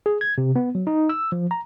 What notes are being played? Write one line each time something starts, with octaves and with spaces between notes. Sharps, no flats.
G#4
G#6
C3
B3
F#3
D#4
E6
F3
A#5